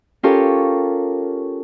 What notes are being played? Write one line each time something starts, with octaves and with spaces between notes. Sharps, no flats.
C#4 F4 G4 A4 A#4 C#5